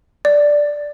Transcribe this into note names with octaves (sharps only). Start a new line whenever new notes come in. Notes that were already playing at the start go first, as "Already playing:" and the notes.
D5